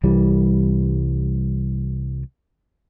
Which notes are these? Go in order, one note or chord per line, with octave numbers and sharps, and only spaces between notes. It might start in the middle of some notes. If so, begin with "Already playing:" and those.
C2 E3 G3